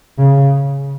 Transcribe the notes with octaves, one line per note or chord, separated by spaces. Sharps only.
C#3